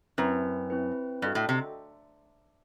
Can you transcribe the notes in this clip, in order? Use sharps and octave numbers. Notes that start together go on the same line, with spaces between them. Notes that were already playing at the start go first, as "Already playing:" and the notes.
F#2 C4 E4 B4
C4 E4 B4
G2 F#4 A4 D#5 G5
A2
C3